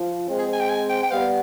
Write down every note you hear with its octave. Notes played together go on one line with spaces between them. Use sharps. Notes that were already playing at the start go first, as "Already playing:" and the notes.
Already playing: F3
G#3 C4
G#4
G#5
G5
G#5
G5
G5
G3 B3 F5